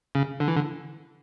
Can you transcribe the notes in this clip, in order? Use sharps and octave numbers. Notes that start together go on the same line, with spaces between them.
C#3
D3
E3
D3